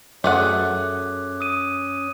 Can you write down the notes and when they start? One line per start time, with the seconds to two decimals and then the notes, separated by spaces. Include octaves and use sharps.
0.24 F#2 A3 C#4 G#4 F#5 D6 F#6
1.41 D#6 D#7